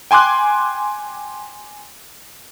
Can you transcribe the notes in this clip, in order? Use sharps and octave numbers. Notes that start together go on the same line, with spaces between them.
G5 G#5 C6 D6 F#6